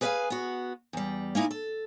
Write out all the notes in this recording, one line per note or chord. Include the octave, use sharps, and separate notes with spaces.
G#4 B4 C5 E5 F5 G#5
B3 F#4
E2 G3
A#3 C#4 D#4 E4
A4